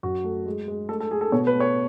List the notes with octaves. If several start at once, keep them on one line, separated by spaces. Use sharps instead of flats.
F#2 F#4
A3
G#3
G#3
A3 A4
A4
A3 G#4
A4
B2 C#5
B4
A3
C#5